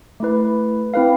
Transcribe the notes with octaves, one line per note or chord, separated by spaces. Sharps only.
A3 E4 B4
C4 E4 B4 F5